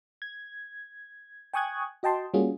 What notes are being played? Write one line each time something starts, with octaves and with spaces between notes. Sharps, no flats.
G#6
G5 G#5 C#6 D#6 F#6 G#6
F#4 D#5 G5 A5 C6
G3 A#3 C#4 F4 F#4 G#4